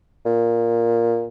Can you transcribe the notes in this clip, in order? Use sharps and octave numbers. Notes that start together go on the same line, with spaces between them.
A#2